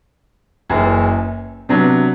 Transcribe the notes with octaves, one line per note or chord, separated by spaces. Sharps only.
F#1 F#2 E3
C3 F#3 B3 D4